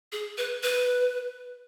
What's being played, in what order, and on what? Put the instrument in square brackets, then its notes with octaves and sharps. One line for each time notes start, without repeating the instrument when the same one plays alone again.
[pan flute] G#4
B4
B4